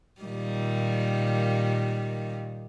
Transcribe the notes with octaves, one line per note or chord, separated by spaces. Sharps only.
A#2 D#3 G3